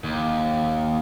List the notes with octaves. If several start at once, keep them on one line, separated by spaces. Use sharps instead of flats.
D#2